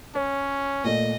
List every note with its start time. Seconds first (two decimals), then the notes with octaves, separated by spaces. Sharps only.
0.15 C#4 C#5
0.84 A#2 A3 D#5